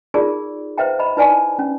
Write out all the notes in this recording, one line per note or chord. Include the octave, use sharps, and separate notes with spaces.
D#4 F4 G4 G#4 A#4 D5
B4 C5 E5 F5 G5 A#5
D#5 A#5 B5
D#4 E4 B4 D5 G#5 A5
C#4